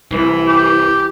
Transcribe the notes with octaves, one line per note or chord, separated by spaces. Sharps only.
C2 E3
G4